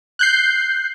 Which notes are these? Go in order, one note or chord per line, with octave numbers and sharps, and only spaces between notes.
F#6 G6 C7